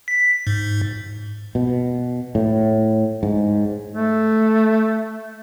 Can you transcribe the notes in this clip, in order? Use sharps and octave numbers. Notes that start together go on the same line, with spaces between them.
B6
G#2
B2
A2
G#2
A3